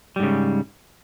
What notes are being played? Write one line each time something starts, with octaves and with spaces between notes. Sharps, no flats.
G#2 C#3 G3